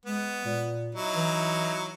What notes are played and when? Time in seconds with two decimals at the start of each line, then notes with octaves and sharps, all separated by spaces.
0.05 G#3 B3
0.45 A#2
0.95 F#3 D#4 E4
1.16 E3